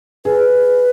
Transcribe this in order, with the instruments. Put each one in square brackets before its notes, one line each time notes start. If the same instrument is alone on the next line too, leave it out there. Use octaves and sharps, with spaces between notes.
[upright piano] G#4 [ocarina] B4